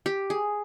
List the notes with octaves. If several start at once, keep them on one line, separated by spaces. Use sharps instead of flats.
G4
G#4